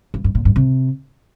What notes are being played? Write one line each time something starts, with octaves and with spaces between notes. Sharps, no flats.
G2
G2
A#2
G2
C3